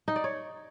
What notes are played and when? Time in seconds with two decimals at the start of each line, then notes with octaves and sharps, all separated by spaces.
0.08 D#4
0.16 D5
0.24 C#5